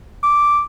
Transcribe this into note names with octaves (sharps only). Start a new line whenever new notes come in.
D6